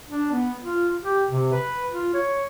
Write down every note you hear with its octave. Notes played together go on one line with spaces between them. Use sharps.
D4
B3
F4
G4
C3
B4
F4
C#5